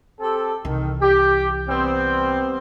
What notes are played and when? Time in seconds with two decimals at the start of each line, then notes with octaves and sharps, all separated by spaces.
0.20 C4 G4 A4
0.65 C2 D#3 E3
1.01 G4
1.68 G3 B3 C4